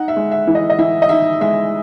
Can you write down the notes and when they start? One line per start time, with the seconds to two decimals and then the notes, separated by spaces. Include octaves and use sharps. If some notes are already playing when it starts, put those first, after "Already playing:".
Already playing: D#4 F#5
0.08 E5
0.16 G#3
0.31 E5
0.47 E3
0.55 D#5
0.70 D#5
0.78 E3 E5
1.02 D#5
1.09 D#4 E5
1.41 G#3 E5